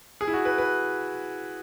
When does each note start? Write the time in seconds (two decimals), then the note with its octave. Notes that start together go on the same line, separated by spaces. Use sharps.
0.21 G#4
0.28 E4
0.33 F#4
0.45 B4
0.58 B4